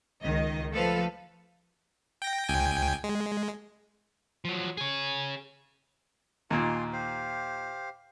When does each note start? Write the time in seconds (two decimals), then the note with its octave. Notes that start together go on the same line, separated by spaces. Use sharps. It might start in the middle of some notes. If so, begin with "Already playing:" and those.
0.22 C#2 D#3 D#5
0.72 F3 A3 A4 B4 F5
2.22 G5 A#6
2.49 C#2 G5 G#5
3.04 G#3
4.45 F3 F#3
4.77 G#4 C#5
6.50 D#2 A#2 F4 G#5 C6
6.93 G4 C5 F5